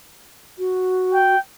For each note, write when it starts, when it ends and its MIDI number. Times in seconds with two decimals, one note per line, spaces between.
0.59 1.35 66
1.13 1.39 79